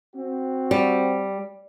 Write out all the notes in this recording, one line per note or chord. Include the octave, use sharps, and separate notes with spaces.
C4 F#4
G3